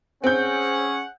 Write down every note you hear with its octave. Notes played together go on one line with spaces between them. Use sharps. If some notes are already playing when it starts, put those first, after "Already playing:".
C4 C#4 G#4 F#5 G6